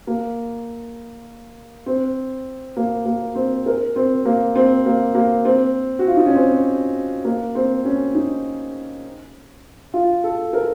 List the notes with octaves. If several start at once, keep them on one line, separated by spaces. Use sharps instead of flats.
A#3
C4
A#3
A#3
C4
A#4
C4
A#3
C4
A#3
A#3
C4
F#4
F4
D#4
C#4
C4
A#3
C4
C#4
D#4
F4
A4
A#4